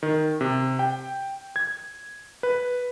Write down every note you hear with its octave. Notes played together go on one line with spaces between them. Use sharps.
D#3
C3
G5
G#6
B4